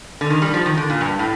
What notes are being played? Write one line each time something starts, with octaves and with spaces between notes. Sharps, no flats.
D3
D#3
G3
F3
D#3
D3
A#2
G2
A2